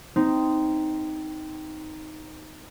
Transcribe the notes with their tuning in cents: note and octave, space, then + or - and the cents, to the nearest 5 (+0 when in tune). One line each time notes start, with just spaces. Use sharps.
C4 -15 D#4 +0